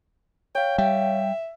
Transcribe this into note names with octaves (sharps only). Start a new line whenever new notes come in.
C#5 F5 G5
G3 E5 G5